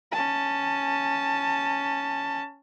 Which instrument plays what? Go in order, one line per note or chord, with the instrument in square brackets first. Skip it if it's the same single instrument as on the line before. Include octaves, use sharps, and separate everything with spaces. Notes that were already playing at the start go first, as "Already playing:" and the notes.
[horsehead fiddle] C#4 A5